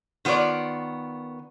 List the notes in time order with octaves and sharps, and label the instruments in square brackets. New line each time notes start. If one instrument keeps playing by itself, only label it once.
[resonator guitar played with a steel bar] D#3 B3 F4 C#5 D5